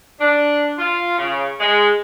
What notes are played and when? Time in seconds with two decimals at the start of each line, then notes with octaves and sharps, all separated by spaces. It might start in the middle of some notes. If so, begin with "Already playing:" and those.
0.20 D4
0.78 F4
1.18 C#3
1.60 G#3